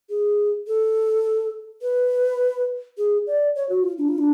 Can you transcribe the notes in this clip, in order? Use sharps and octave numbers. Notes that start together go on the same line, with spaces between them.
G#4
A4
B4
G#4
D5
C#5
F#4
F4
D4
F4
D4